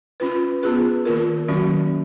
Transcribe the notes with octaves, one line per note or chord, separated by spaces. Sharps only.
C#4 F4 B4
B3 F4 G#4 B4
D#3 A#3 F4 A#4
D#3 F#3 A#3 C#4 F#4